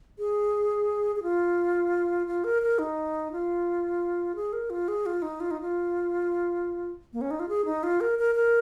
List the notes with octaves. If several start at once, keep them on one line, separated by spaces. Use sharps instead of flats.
G#4
G#4
F4
F4
A#4
A#4
D#4
F4
G#4
A#4
F4
G#4
F4
D#4
F4
D#4
F4
A#3
C#4
D#4
F4
G#4
D#4
F4
A#4
A#4
A#4